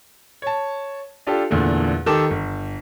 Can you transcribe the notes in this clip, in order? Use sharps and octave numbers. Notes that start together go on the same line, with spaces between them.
C#5 A5
D4 F4 G4 A4
E2 A#2 D3 A3
D#3 G4 A4 D6 E7
G1